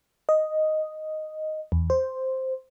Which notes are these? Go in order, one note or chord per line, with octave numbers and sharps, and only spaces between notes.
D#5
E2
C5